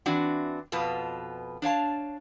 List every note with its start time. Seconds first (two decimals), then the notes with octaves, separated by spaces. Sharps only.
0.06 E3 C4 D4 F#4
0.72 F2 B2 F4 B4 A5
1.62 D4 C#5 F5 A5